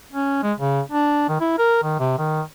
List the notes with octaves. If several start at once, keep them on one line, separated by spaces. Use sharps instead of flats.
C#4
G#3
C#3
D4
D#3
E4
A#4
D#3
C3
D#3